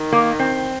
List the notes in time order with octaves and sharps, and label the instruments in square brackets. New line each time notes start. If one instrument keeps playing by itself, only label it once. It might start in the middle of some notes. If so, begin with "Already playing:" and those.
Already playing: [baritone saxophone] D#3
[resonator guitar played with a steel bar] A#3
C4